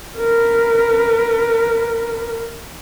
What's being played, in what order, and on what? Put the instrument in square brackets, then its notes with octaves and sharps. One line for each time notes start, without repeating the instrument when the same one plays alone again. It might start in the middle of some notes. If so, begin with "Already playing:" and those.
[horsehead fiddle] A#4 B4